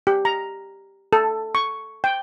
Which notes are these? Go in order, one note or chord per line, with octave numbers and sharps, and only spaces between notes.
G4
A#5
A4
C#6
G5